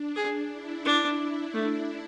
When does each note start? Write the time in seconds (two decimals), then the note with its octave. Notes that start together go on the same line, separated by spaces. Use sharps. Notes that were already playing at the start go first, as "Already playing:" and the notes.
Already playing: D4
0.16 G#4
0.51 E4
0.85 D4
1.54 A3